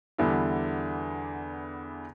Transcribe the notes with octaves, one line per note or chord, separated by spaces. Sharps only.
E2 D3 G3 B3 D4 E4